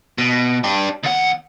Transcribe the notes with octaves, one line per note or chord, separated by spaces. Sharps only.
B2
D4 G4
D#2 F#5